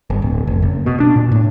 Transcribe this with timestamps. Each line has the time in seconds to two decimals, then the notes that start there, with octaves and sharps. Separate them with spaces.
0.10 G1
0.22 D1
0.47 F1
0.62 F#1
0.86 B2
1.00 D4
1.16 A#2
1.32 A2